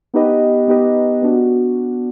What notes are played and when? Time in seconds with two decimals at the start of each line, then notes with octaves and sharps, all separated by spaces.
0.14 B3 D#4 G4 B4 D#5
0.68 B3 D#4 G4 B4 D#5
1.22 B3 D4 F#4